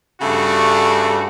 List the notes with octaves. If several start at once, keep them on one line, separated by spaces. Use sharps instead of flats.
G2 C#3 A3 D4 F#4